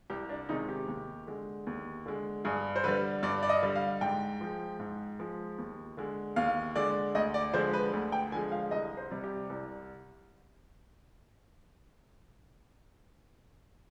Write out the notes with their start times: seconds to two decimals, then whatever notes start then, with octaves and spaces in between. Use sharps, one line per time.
0.10 C2 G4
0.29 D4
0.49 C3 D#3 G#3 D#4
0.69 G4
0.88 D#2
1.27 D3 G#3
1.67 D#2
2.06 D3 G#3
2.45 G2 G#4
2.76 C5
2.84 D3 G3 B4
3.23 G2 D5
3.43 D5
3.49 D#5
3.62 D3 G3
3.76 F5
4.01 G#2 G5
4.41 F3 G#3
4.79 G#2
5.19 F3 G#3
5.58 D#2
5.97 D3 G#3
6.36 D#2 F5
6.75 D3 G#3 D5
7.15 D2 D#5
7.34 D5
7.54 D3 F3 G#3 C5
7.73 B4
7.93 D2
8.12 G5
8.32 D3 F3 G#3 G#5
8.52 F5
8.71 C2 D#5
8.97 C5
9.11 C3 G3
9.24 G4
9.50 C2